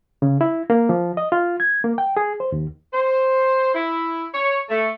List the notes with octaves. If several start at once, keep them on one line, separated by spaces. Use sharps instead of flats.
C#3
E4
A#3
F3
D#5
F4
G#6
A#3
G5
G#4
C5
D#2
C5
E4
C#5
A3